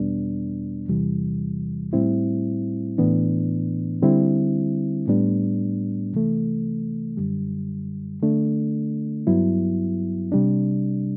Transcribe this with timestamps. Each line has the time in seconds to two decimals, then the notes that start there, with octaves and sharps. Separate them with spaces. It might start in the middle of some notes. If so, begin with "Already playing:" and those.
Already playing: E2 B2 G3 B3 D4
0.89 E2 C3 E3 G3
1.93 A2 G3 C4 E4
2.98 A2 E3 B3 D4
4.02 D3 G3 C4 E4
5.08 A2 G3 B3 D4
6.13 C3 E3 A3
7.17 F#2 D3 G3
8.22 D3 A3 D4
9.27 G2 F#3 B3 E4
10.32 C3 G3 D4